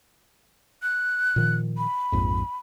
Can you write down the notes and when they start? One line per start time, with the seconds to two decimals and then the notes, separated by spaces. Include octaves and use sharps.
0.82 F#6
1.36 A#2 D#3 F3
1.77 B5
2.12 A#1 F2 G#2